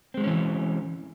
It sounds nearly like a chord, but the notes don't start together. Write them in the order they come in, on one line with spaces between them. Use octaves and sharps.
C4 G#3 F#3 C#4 E3